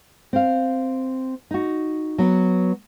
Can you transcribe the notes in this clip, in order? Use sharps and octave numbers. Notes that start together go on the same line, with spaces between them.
C4 F5
D#4 F#4
F#3 B3